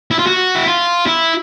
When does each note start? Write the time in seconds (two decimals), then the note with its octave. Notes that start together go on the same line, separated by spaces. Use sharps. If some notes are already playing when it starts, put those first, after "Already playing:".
0.11 E4
0.19 F4
0.27 F#4
0.55 E4
0.66 F4
1.06 E4